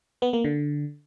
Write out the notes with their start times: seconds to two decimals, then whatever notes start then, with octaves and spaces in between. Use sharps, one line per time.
0.22 B3
0.33 A#3
0.44 D3